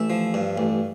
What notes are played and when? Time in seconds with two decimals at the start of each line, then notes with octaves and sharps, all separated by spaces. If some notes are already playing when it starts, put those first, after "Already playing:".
Already playing: A1 E5
0.10 F3
0.34 G2
0.58 A1